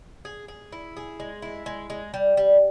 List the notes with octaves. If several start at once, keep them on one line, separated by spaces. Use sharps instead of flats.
G#4
G#4
E4
G#4
G#3
E4
G#3
G#3
G3
G3